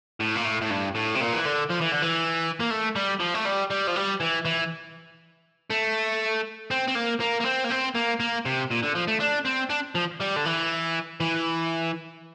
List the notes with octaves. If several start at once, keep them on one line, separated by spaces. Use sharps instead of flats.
A2
A#2
A2
A2
G2
A2
C3
A#2
E3
D3
F3
E3
D3
E3
A#3
A3
G3
F3
A3
G3
G3
F3
G3
E3
E3
A3
C4
C4
A#3
A#3
A#3
C4
A#3
C4
A#3
A#3
C3
A#2
D3
F3
A3
D4
C4
D4
F3
G3
D3
E3
E3